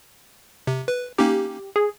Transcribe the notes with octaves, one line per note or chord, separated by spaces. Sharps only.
C3
B4
A#3 C#4 D#4 G4
G#4